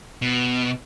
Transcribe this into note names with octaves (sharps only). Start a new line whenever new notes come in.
B2